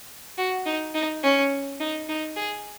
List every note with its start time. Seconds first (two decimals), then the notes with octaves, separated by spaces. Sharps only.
0.38 F#4
0.66 D#4
0.95 D#4
1.23 C#4
1.80 D#4
2.09 D#4
2.36 G#4